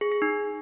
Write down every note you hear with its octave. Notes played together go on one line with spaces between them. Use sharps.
G#4
G#4
D#4